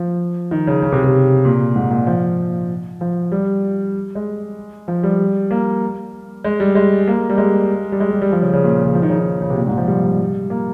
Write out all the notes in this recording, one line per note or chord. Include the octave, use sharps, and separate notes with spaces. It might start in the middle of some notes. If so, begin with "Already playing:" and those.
Already playing: F3
D#3
C#3
C#3
C3
C3
A#2
G#2
A#2
F3
F3
G3
G#3
F3
G3
A#3
G#3
G3
G#3
A#3
G3
G#3
G3
G#3
G3
G3
F3
C#3
C#3
A#2
C#3
F3
D#3
C#3
D#3
C#3
C3
A#2
G#2
F3
G3
A#3